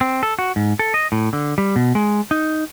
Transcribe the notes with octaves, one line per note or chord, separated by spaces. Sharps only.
C4
A4
F#4
G#2
A4
D#5
A2
D3
G3
B2
G#3
D#4